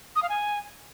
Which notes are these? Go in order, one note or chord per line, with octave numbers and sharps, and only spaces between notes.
D#6
F5
G#5